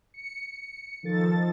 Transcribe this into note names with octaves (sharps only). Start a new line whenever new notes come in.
C#7
D#3 F3 A4 A6